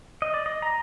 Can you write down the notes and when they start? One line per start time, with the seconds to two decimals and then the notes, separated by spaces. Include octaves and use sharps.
0.22 D#5
0.34 D5
0.46 D#5
0.62 A#5